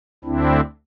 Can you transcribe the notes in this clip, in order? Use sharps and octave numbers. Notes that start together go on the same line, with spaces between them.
D2 D3 C4 D4 E4